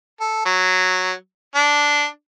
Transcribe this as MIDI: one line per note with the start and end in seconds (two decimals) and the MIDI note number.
0.20 0.42 69
0.45 1.12 54
1.55 2.06 62